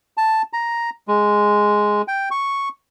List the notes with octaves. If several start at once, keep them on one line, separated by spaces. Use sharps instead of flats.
A5
A#5
G#3
G5
C#6